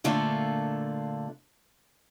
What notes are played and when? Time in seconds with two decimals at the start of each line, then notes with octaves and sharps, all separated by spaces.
0.04 A#2 D3 A3 A#3 D4 F4